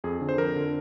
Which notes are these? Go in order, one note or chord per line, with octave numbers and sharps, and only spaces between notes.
F2 G#4
D3
C5
F2 A#4
D3